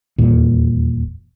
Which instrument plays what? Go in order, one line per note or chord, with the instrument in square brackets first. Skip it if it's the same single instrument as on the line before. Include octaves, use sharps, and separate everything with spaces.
[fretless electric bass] D#1 E2 A#2